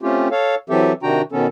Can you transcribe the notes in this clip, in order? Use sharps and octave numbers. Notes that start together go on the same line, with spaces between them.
A3 C4 C#4 F4 G4
A4 C#5 F5
E3 F#3 C4 G4 A4 E5
C3 D#3 D4 F#4 G5 A#5
B2 D#3 B3 C#4 A4